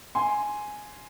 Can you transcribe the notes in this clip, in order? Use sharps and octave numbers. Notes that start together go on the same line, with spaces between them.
G#5 C6